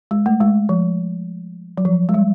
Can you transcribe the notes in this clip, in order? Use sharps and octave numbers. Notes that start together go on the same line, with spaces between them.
G#3
A3
G#3
F3
F#3
F3
G#3
G3